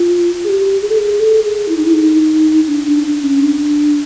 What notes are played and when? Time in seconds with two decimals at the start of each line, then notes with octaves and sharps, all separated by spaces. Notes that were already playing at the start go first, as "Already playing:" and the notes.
Already playing: F4
0.44 G#4
0.49 G4
0.82 G#4
0.89 A4
0.98 G#4
1.20 A4
1.44 G#4
1.69 E4
1.77 D#4
1.85 E4
1.93 D#4
2.68 D4
2.87 D4
3.06 D4
3.24 C#4
3.43 D4